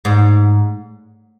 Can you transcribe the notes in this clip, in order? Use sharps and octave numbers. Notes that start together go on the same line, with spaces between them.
G#2